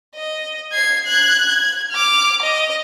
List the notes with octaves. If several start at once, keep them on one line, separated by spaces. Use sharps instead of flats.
D#5
G#6 C7
F#6 G#6
G#6
D6 F6
D#5